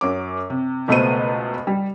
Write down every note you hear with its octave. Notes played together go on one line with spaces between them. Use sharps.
F#2 F#3 D6
C3
C#2 B2 A3 B3 C5 D#7
G3